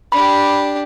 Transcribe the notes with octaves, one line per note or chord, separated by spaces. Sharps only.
D4 G4 B5